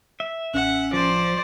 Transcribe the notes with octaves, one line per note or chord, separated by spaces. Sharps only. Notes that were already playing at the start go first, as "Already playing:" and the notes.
E5
A1 C#4 F#5
F3 C5 D5